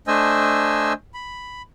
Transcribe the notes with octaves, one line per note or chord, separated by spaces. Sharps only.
A3 D4 C5 D#5 G#5 E6
B5